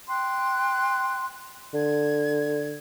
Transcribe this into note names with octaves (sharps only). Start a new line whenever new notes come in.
G5 C6 F#6
D3 G#6